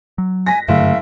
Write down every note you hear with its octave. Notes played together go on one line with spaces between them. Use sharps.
F#3
G#5 A#6 B6
F#1 G2 D3 A3 E5 F5